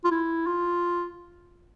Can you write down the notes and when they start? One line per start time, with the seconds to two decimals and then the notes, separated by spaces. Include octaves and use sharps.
0.04 F4
0.11 E4
0.46 F4